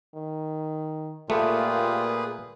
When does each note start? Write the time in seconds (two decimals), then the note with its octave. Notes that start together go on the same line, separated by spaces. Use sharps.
0.14 D#3
1.30 A#2 A3 A#3 F4 G4 G#4 B4